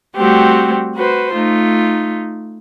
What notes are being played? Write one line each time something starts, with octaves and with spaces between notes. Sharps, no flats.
G3 A3 C4 F#4 G4
F#4 B4 C5
A3 D#4 F4